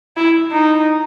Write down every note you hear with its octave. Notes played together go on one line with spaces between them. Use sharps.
E4
D#4